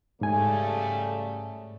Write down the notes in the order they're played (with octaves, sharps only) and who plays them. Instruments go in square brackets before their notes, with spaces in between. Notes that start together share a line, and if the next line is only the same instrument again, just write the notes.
[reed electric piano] G#2 G#5 [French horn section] C#3 G3 A3